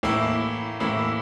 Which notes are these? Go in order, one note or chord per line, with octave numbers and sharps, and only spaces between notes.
A2 E3 A#3 E4
A2 E3 A#3 E4